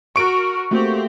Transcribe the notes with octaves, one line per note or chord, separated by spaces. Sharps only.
F#4 A#4 C#6 D7
A3 A#3 C4 F#4 G4